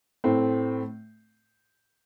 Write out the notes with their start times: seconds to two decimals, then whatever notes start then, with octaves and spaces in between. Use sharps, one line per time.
0.24 A2 A3 C4